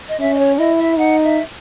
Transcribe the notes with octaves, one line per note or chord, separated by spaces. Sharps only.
D#5
C#4 E5
D#5
C#5
E4 D#5
E5
D#4 F#5
E5